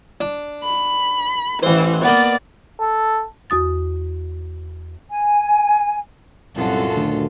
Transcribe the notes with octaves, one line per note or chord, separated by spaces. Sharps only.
D4
B5
A1 E3 C5
A#3 B3 D5
A4
E2 F#4 D#6 A6
G#5
C2 F#2 A#2 B3 F4 F#4 A4
D2 D#3